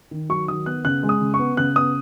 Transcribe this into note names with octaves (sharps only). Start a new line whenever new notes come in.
D#3
F#3 C#6
D#3 D#6
B3 F#6
C#3 F#6
G#3
D#6
C#3
C#6
B3
C#3 F#6
B3 D#6